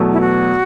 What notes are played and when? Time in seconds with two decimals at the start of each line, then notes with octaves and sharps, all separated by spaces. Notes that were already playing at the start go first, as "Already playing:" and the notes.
Already playing: E2 B2 F#3 A3
0.13 E4
0.20 F#4